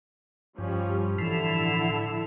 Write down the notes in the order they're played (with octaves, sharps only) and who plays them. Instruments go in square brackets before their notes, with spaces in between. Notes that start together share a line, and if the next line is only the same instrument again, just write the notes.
[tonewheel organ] G2 [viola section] F3 G3 C#4
[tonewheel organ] A2 E3 F3 [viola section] D3 E4 A4